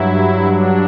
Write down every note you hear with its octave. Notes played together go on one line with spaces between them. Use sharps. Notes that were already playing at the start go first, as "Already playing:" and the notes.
Already playing: G2 F#3 E4
D4